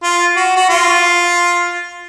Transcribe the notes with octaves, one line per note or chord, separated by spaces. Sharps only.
F4
F#4
F#4
F4